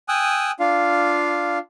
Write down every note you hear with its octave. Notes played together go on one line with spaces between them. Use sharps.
G5 G#5 D#6 E6 F#6
D4 F4 F5